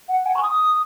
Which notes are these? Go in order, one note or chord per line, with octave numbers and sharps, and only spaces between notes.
F#5
G#5
C#6
D#6